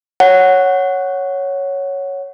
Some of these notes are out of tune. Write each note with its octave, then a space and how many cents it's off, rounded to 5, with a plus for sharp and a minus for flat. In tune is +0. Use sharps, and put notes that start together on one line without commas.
C#5 +0 F#5 +0